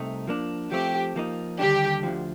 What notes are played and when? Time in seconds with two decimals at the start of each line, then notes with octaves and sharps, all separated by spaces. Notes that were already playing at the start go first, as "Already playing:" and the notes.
Already playing: C2 C3 A3 D#4
0.27 F3 A#3 D4
0.72 F3 A3 C4 G4
1.16 F3 A#3 D#4
1.59 D#2 D3 G3 D4 G4
2.03 D2 D3 F3